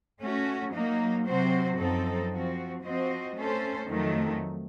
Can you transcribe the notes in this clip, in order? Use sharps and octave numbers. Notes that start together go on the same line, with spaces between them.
A3 C#4 F#4
F#3 A#3 D#4
C3 F#3 C4 F#4 C5
F#2 F3 C4 D#4 A4
F3 C4 F#4
F3 C4 F#4 C5 D#5
A3 C#4 A4 C5
F2 D#3 F#3 A3